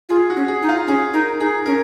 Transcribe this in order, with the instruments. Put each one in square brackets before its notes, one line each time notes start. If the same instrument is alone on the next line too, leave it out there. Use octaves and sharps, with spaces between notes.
[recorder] F4 [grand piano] G#4
[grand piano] F#4
[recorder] C#4
[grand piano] G#4
[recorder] D#4
[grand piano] F4
[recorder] C#4 [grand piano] G#4
[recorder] D#4 [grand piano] A#4
[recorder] D#4 [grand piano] G#4
[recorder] C#4 [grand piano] A#4